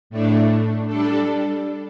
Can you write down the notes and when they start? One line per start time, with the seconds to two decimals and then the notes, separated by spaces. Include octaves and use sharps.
0.10 A2 A3 D4
0.87 G3 D4 A4